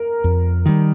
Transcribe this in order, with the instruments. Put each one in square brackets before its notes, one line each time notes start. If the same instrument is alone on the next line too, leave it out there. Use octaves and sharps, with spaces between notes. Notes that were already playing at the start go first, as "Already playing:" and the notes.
Already playing: [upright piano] A#4
[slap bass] F2
D#3 G3